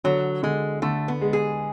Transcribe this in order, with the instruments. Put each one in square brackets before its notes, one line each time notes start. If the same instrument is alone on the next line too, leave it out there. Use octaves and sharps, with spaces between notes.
[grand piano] D3 [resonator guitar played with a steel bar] F#3
[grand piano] D3 [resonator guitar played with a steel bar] G#3
[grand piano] D3 [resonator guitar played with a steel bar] A3
[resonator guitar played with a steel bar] B3
[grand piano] G#3
[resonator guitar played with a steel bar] G#4